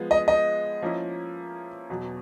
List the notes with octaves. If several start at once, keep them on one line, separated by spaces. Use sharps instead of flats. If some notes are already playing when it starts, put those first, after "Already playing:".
Already playing: F3 G#3 B3
D#5
D#5
F3 A#3 C#4 E4
E2 B2 F#3